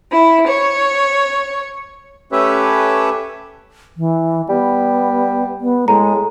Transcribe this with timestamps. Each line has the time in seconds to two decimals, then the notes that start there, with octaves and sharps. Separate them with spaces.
0.12 E4
0.47 C#5
2.32 A3 C#4 G4 B4 C#5 E5
3.97 E3
4.49 G3 B3
5.61 B3
5.88 A2 G#3 A#5